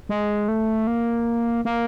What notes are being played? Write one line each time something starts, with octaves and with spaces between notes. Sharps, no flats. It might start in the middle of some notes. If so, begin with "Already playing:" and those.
G#3
A3
A#3
A#3